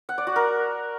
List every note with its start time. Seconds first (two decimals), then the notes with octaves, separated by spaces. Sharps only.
0.09 F#5
0.18 D5
0.27 F#4
0.36 A#4